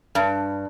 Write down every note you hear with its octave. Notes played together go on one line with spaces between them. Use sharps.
G2